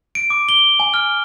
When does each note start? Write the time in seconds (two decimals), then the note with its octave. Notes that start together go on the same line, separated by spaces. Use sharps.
0.15 D7
0.30 D6
0.49 G7
0.80 G#5
0.94 F6